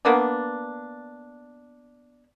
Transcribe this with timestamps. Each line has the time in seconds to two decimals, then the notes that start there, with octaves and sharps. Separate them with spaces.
0.05 A#3 B3 D4